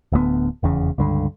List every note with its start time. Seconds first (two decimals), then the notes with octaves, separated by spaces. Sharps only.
0.12 D1 D2 G#3 B3
0.63 F1 E2 C#3
0.98 C#2 G2 D3